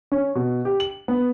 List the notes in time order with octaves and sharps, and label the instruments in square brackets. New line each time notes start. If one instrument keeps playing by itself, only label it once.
[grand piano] C#4
B2
G4
F#7
B3